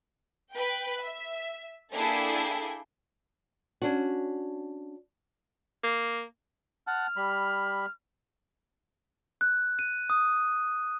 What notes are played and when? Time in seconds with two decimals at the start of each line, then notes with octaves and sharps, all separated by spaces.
0.53 B4 G5
1.00 E5
1.93 A#3 D4 E4 G#4 A4 G5
3.82 C#4 D4 F#4
5.84 A#3
6.87 F#5 A5 F6
7.16 G3 B5
9.41 F#6
9.79 D#7
10.10 D#6